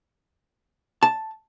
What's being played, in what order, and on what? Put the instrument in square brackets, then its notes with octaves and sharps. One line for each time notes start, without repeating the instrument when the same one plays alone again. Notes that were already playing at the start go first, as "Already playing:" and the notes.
[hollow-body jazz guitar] A5